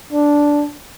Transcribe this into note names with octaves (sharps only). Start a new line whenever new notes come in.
D4